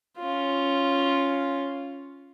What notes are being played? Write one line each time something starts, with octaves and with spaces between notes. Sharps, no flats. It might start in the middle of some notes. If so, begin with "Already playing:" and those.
C#4 F4